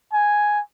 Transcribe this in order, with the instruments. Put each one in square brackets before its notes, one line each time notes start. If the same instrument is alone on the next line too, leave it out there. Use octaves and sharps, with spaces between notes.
[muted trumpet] G#5